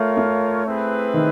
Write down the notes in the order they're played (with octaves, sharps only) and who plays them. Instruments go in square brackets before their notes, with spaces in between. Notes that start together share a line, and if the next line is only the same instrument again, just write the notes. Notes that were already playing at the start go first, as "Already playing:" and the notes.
Already playing: [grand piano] A3 [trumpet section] F4 A#4 C#5 F5
[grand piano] A3
[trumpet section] C4 E4 G#4 B4
[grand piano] D#3